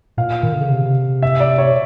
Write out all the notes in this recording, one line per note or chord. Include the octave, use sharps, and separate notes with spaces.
A#2 F5
D#3
D3
C#3
C3
E5
D5
C#5